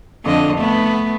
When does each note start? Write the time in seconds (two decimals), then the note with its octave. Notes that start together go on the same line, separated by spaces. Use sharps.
0.24 F2 D3 D#5
0.56 A3 B3